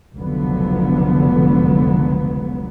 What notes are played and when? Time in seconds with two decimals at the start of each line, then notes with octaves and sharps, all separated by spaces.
0.15 F1 C#2 D3 F3 F#3 B3